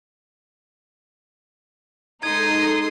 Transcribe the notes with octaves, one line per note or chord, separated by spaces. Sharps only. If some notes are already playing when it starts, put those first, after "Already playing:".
G#3 D#4 A4 C6 D#6 G#6